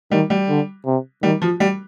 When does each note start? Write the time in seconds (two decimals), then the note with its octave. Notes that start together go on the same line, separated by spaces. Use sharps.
0.11 D#3 G3
0.30 G3
0.49 D3
0.86 C3
1.23 D#3 G3
1.42 F3
1.60 G3